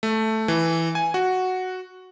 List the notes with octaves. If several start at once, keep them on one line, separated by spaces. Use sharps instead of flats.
A3
E3
G#5
F#4